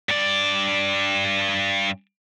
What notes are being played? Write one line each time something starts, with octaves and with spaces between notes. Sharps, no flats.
G2 D5